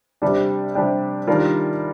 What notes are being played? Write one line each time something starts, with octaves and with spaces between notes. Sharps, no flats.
C3 G3 D4 G4
C3 G3 D4 G4
D#3 G3 D4 F4 A#4